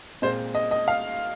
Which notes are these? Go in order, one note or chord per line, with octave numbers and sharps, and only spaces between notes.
A#2 G#3 C4 C5
D#5
D#5
F5